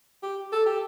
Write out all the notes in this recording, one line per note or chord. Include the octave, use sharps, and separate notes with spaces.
G4
A4
G4